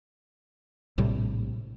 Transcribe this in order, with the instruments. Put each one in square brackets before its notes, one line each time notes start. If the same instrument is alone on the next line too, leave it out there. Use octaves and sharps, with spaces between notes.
[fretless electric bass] A#1 A2 C3 G3